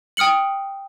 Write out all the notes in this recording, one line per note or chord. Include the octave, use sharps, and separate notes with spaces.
G5 D#6 F6 C#7 F#7